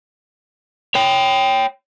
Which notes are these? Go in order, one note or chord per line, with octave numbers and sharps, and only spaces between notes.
C#5 G5